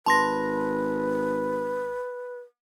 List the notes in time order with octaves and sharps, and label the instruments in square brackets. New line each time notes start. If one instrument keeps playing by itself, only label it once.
[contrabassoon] G#1 [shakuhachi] B4 [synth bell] A5 C6 A#6